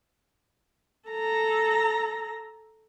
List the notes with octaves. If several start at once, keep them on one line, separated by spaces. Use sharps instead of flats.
A4 A#5